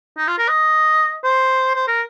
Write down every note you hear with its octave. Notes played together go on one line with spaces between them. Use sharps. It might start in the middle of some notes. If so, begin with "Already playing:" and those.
D#4
F4
A#4
D#5
C5
C5
A#4